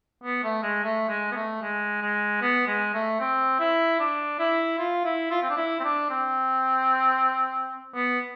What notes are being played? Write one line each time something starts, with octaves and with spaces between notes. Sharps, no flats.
B3
A3
G#3
A3
G#3
B3
A3
G#3
G#3
B3
G#3
A3
C4
E4
D4
E4
F4
E4
F4
C4
D4
E4
C4
D4
C4
B3